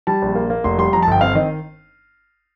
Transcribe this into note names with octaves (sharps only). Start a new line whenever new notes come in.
G3 A5
A#1
A#3
A#3
F1 C6
G3 C6
F2 A#5
A5
G1 G5
C4 F5
D#3 D#5